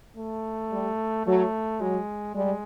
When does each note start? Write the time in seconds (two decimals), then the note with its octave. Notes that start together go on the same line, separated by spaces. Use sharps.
0.17 A3
0.71 G3
1.26 F#3 A3
1.80 F#3 G#3
2.35 G3 G#3